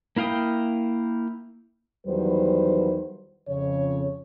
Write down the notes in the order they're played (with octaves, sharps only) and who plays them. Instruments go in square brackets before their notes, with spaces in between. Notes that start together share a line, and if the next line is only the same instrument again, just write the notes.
[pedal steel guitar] A#3 E4 F5 G5 D#6
[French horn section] E2 D#3 F#3 G3 B4 C5
F2 C#3 C#5